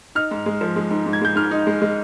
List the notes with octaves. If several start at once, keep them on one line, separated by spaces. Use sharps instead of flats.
D#4 F6
G#2
G#3
F3
G#3
G#2
G#2
G#6
G#3 G6
G#2 F6
D#4
G#3
G#3